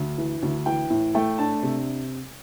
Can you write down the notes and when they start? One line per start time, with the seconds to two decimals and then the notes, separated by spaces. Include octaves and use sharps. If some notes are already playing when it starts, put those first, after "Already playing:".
Already playing: D2
0.18 E3
0.42 D2
0.66 E3 G5
0.90 A2
1.15 A3 G5
1.38 D4 A5
1.63 C3